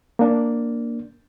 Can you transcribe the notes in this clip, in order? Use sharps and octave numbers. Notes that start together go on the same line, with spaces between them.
A#3 D4